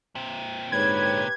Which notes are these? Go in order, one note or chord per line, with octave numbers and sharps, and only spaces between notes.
A#2 C4
G#2 D3 G4 B4 C#5 G#6